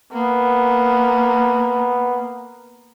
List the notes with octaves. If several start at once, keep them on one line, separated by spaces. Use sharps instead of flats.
A#3 B3